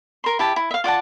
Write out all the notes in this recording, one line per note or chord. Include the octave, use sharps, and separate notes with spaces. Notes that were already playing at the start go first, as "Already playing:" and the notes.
A#4 C6
E4 G4 A5
E4
E5 F5
F4 D5 F#5 A5